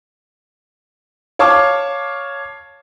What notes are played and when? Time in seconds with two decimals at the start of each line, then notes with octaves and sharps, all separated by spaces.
1.39 C#5 F5 A5 C#6 D6